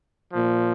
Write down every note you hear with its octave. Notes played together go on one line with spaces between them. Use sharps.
A#2 F3